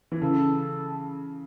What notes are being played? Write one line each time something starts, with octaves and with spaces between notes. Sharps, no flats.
E3
C#3 A4